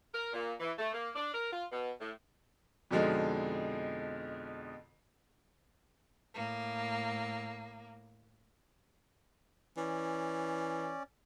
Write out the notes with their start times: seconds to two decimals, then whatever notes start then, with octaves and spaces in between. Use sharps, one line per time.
0.13 A#4
0.32 A#2
0.60 E3
0.77 A3
0.93 A#3
1.15 D4
1.33 A#4
1.51 F4
1.71 B2
1.99 A2
2.91 F2 B2 D3 F3 G#3 D#4
6.35 A2 A#3
9.77 E3 C#4 D5